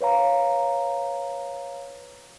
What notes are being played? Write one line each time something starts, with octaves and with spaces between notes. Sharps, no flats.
B4 C#5 F5 A#5